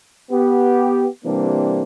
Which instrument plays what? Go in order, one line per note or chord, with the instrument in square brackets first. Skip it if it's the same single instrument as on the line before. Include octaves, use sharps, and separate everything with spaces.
[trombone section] B3 G4
C3 E3 G3 A#3 C4 D4